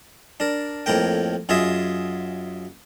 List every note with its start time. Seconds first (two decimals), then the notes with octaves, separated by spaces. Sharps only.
0.40 D4 A#4
0.86 F2 A2 A#3 A#4 G5
1.49 F#2 F4 G#4 D#5 E5